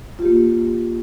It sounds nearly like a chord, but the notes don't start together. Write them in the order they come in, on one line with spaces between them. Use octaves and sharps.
F4 G4 A#3